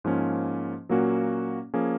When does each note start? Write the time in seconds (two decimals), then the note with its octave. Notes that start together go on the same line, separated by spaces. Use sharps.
0.04 G#2 F3 A#3 C#4
0.89 A#2 F#3 A#3 C#4 F#4
1.74 F3 A#3 C#4 G#4